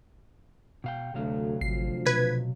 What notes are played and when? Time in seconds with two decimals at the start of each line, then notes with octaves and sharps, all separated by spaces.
0.84 B2 F5 G5
1.14 D2 C3 F#3 A3 F5
1.61 G#1 D2 F3 C7
2.06 B2 B4 G#6 B6